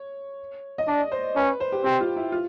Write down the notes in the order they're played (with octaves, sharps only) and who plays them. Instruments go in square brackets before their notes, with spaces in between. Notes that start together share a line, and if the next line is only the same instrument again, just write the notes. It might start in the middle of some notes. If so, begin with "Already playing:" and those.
Already playing: [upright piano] C#5
D#5
[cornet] D4 [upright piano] D5
[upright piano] C5
[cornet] C#4 [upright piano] B4
[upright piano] C5
G4
[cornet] C4 [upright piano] G4
[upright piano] F4
E4
F4